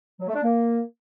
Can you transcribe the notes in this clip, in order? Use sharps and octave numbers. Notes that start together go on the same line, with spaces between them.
F#3
A3
D4
A#3